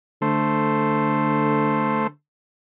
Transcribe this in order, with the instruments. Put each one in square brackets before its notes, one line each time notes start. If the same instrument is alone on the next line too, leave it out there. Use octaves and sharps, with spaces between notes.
[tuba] D3 [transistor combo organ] A3 C5